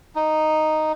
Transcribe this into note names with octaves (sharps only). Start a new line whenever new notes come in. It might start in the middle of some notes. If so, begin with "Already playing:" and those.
D#4